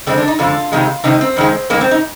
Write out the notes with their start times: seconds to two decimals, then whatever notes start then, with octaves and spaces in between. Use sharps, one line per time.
0.07 F2 D3 G#3 C4
0.18 D4
0.28 D#4
0.39 F2 D3 G#3 F4
0.72 C3 D#3 G#3
1.04 C3 D#3 G#3 D#4
1.21 C4
1.37 F2 D#3 G#3
1.70 F2 D#3 G#3 A#3
1.81 C4
1.91 D#4